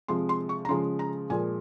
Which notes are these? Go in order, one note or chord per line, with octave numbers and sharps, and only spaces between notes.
C3 F3 G#3 C6
C6
C#6
A#5
C#3 F3 G#3 C6
A#5
A#2 F3 G#3 G#5